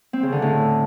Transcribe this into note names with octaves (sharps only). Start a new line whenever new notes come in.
C4
C#3
D3
A2